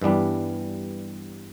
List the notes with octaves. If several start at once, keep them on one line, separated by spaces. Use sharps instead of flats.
G2 E3 G3 B3 D4